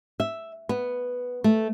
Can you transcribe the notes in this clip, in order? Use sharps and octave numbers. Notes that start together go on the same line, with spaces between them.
E5
B3
A3